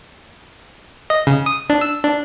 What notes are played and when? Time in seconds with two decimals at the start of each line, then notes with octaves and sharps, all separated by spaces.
1.10 D#5
1.27 C#3
1.46 D#6
1.70 D4
1.81 E6
2.04 D4